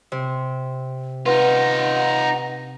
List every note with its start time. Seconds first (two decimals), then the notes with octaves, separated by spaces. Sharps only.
0.12 C3
1.26 D#4 F4 B4 F#5